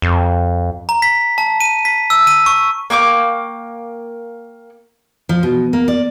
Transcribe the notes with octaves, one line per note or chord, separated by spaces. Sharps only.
F2
A#5
B6
A5
D#7
B6
E6
D#7
C#6
A#3 G5 C#6 D6
F3
B2
A#3
D5